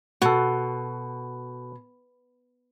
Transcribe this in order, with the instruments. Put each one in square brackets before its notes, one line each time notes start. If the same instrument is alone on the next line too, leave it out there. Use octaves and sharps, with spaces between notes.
[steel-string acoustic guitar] B2 [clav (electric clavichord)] F#4 A4